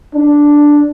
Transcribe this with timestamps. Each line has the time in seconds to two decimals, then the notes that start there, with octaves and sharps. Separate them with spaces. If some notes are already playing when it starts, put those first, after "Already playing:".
0.15 D4